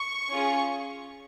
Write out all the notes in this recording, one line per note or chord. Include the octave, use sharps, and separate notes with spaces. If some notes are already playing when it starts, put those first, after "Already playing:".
Already playing: C#6
C#4 F4 G#4